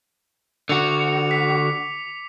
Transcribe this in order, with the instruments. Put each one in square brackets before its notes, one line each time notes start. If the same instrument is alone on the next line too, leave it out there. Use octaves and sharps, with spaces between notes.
[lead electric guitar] D3 F#4 [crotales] D6 C#7 F7
[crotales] B6